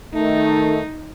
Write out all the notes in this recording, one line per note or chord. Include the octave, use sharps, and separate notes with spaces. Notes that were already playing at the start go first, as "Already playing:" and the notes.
D#3 A3 D#4